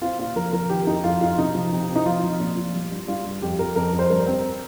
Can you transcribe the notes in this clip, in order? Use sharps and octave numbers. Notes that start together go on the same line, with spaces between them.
C4 F4
A#2 F4
F3 A#4
F3 A#4
D#3 G4
F2 D#4
F2 F4
F2 F4
C3 D#4
F3
C3
C4
D#4
F3 F4
F3
A#2
F3
G3
G2
G2 F4
G2
F2 G4
F2 A#4
F2 A#4
F2
C5
G2 A#4
C4